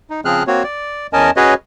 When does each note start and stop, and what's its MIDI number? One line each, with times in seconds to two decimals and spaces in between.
0.10 0.21 63
0.25 0.43 49
0.25 0.43 53
0.25 0.43 60
0.25 0.43 68
0.25 0.43 89
0.25 0.43 90
0.47 0.63 58
0.47 0.63 60
0.47 0.63 66
0.47 0.63 73
0.64 1.07 74
1.13 1.30 40
1.13 1.30 61
1.13 1.30 70
1.13 1.30 75
1.13 1.30 80
1.13 1.30 81
1.37 1.54 61
1.37 1.54 66
1.37 1.54 68
1.37 1.54 71
1.37 1.54 73
1.37 1.54 75